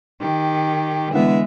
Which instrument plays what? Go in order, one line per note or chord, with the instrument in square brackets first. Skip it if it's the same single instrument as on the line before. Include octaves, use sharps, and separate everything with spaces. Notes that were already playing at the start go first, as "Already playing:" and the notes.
[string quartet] D#3 G4
[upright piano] D3 E3 B3 [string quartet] G#3 E5